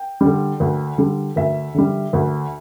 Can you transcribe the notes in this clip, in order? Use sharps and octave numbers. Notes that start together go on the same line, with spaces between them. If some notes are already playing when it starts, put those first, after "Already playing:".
Already playing: G5
D3 G3
D2
D3 G3
D2 E5
D3 G3
D2